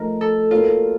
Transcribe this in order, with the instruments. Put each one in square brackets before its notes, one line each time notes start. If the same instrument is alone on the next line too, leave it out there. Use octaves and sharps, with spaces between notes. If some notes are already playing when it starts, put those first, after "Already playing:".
Already playing: [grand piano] F3 A3 D#4 [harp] A#4
[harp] A4
[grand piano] A#3 D#4 F#4 A#4 C#5 [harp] F4